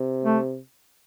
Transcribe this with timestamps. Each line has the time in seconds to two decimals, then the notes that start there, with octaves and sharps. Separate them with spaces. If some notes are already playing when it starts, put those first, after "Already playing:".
Already playing: C3
0.25 A3